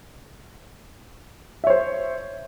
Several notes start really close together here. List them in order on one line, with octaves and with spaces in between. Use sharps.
E5 C#5 C5